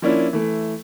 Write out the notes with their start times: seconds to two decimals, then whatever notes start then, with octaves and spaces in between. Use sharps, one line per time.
0.02 F3 A#3 C#4 D4 E4
0.33 E3 A3